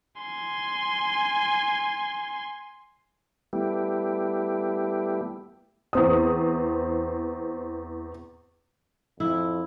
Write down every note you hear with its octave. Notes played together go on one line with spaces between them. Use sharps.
G#5 C6
G3 A3 B3 E4 G4
E2 C4 D#6
F2 E4